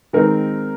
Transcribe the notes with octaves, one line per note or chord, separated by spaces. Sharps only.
D#3 G#3 C4 D#4 A#4